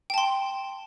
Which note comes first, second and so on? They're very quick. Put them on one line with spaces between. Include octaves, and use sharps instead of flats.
G5 A5 C6